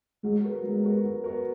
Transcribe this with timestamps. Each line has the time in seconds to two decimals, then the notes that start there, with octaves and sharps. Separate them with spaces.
0.24 F#3 G#3
0.44 B3 F#4 A#4
0.63 F#3 G#3
0.84 B3 F#4 A#4
1.04 F#3
1.24 B3 F#4 A#4